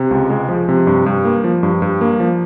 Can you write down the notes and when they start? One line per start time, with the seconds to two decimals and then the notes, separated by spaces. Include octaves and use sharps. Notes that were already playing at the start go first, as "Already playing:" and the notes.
Already playing: C3
0.11 C#2
0.30 G#3
0.49 F3
0.69 C3
0.87 G2
1.06 G2
1.25 A#3
1.44 F3
1.63 G2
1.82 G2
2.01 A#3
2.20 F3